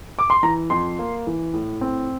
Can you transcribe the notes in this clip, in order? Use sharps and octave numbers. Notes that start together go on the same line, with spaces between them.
D6
C6
E3 A#5
F2 C6
A#3
E3
A2
C4